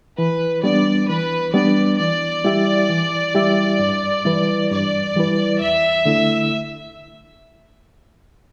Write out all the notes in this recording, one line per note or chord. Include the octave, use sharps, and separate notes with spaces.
E3 B4
G3 B3 D4 D5
E3 B4
G3 B3 D4 D5
E3 D5
G3 E4 G4 E5
E3
G3 E4 G4 E5
G2
E3 G3 E4 B4
G2 D5
E3 G3 E4 B4
E2 E5
D3 A3 E4